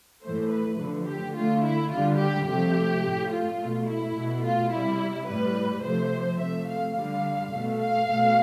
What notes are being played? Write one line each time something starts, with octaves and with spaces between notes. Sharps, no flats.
A2 E3 A3 C5
B4
D3 F3 A3
G4
D3 A3 F4
E4
D3 G3 F4
G4
C3 F3 A3 G4
A2 F3 A3
F4
B2 A3
E4
B2 A3
F4
C3 G3 E4
A2 G3 B4
C3 F3 A3 C5
C3 F3 A3 E5
F5
D3 G3 F5
B2 A3
F5
B2 A3